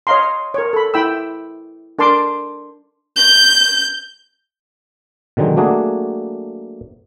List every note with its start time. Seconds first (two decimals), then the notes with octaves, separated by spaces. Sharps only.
0.07 C#5 D#5 F5 A#5 C6
0.54 A#4 C#5
0.73 A4 B5
0.94 E4 G5 B5 E6
1.99 D4 A#4 A5 C6 D6
3.16 G6
5.37 B2 D3 D#3 F#3 G#3
5.57 F#3 A3 A#3 D4 F#4 G#4